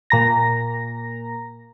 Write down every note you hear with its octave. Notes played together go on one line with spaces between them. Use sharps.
A#2 A#5 A#6